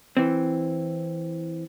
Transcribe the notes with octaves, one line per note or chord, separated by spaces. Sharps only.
E3 C4